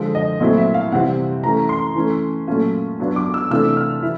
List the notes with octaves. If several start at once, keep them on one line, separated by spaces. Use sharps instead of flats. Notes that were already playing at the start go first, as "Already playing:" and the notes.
Already playing: D3 F3 G#3
D#5
A#2 F#3 A3 C4 E4 D#5
E5
F5
C3 E3 G3 C4 F#5
E3 A3 C#4 A#5
C6
E3 A3 C#4
A#2 F#3 A3 C#4 F4
F#3 B3 D4 F4
D6
E6
C3 E3 A3 D4 F4 E6
F6
E3 E4